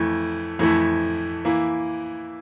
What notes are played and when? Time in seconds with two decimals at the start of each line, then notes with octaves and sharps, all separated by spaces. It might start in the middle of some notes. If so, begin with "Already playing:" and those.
Already playing: F2 E3 A3 E4
0.59 F2 E3 A3 E4
1.45 E3 A#3 E4